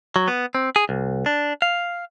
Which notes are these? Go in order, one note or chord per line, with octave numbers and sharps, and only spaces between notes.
F#3
B3
C4
G#4
C2
D4
F5